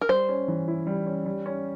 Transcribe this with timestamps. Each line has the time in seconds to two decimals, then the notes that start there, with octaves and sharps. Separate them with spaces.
0.01 A#4
0.09 G3 C5
0.29 C#4
0.48 E3
0.68 E4
0.87 G3
1.07 C#4
1.26 G3
1.46 C#4